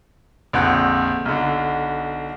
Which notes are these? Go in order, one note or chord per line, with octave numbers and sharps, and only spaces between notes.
A#1 F2 D3 F#5 F#6
B1 D3